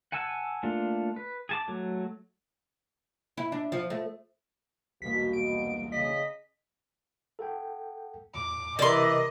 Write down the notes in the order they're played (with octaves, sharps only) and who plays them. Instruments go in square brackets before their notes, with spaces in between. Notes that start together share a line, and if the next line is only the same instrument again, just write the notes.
[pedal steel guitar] F#5 G#5 A5 E6
A3 A#3 D4 F4
B4
G#4 A5 D6
F#3 A3
[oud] E4
D4
F3
A3
[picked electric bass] E1 C2 A#3 [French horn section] B2 [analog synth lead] B6
[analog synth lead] D7
[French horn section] C#3 [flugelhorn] D#5 [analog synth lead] B6
[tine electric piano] A4 F#5 G5
[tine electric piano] E2 A2 [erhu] D6
[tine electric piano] C3 A#4 [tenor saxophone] E3 [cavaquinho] D5 C6 [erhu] D#5